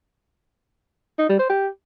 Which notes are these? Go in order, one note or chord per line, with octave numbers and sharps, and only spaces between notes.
D#4
G3
C5
G4